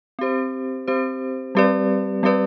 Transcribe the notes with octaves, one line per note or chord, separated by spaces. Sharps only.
C4 G4 C5
C4 G4 C5
G3 C4 G4 B4 D5
G3 C4 G4 B4 D5